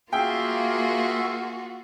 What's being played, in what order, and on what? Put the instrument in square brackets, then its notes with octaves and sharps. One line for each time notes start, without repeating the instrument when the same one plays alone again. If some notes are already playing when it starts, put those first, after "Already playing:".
[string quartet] A#3 [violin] F4 F#4 [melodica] G#4 E5 F5 [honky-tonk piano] G5